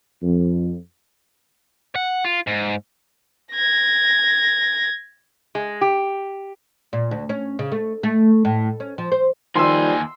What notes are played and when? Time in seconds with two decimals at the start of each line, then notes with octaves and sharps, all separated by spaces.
0.22 F2
1.96 F#5
2.25 F4
2.47 G#2
3.54 G#6 A#6
5.55 G#3
5.81 G4
6.93 A#2
7.11 D2
7.29 C#4
7.59 C#3
7.72 A3
8.03 A3
8.45 A2
8.80 C#4
8.98 F3
9.12 C5
9.55 D#2 D#3 F3 G3 G#5 C6 E6